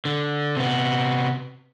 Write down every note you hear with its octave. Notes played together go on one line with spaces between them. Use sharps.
D3
C3 B3